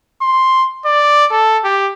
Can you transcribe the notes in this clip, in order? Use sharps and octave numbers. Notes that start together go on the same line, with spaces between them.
C6
D5
A4
G4